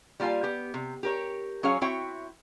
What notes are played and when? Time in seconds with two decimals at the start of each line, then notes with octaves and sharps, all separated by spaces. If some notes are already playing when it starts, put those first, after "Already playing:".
0.20 G3 A#3 F4 F5 G#5
0.43 B3 G4
0.74 C3
1.03 G4 A#4 C#5
1.63 F#3 C#4 G#4 C#5 F5
1.81 C4 E4 F#4 C#5 E5 G5